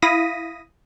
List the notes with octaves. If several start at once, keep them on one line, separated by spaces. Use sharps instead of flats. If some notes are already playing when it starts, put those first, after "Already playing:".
E4 F5 D#6 A#6 B6 D#7